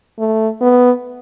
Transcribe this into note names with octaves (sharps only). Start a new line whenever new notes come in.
A3
B3